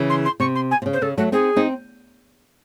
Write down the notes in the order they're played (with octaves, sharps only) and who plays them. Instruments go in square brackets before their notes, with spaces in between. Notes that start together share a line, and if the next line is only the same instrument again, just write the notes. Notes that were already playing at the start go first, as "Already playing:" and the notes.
Already playing: [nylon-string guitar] C#3 E3
[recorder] C6
C6
[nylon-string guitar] C3 [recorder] C#6
[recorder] C6
G#5
[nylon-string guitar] C3
C#3
[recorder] C5
[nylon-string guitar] C#3 [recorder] A4
[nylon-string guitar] F#3 A3 [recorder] F#4
[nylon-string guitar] C4 D#4 [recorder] G#4
[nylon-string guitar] C4 D#4